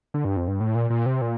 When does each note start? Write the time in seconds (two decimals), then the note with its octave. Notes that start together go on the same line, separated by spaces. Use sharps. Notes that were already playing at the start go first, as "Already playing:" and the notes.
0.14 D3
0.25 G2
0.37 F2
0.48 G2
0.60 A2
0.75 A#2
0.90 A#2
1.06 C3
1.22 A#2